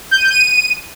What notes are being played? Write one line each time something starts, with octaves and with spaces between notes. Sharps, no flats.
G6
D#7
G6
D#7